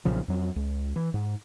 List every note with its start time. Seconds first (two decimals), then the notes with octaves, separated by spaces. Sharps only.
0.05 B1 A#2 C#3 F3
0.28 F2 F#3
0.56 C#2
0.96 E3
1.14 G#2